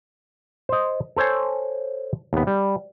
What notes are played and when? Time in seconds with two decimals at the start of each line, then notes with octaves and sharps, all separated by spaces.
0.69 C5 D#5
1.17 A4 C5 C#5 G#5
2.33 D#2 B3
2.47 G3